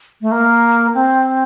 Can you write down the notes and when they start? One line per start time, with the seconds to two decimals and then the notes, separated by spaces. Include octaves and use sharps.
0.21 A3
0.32 A#3
0.94 C4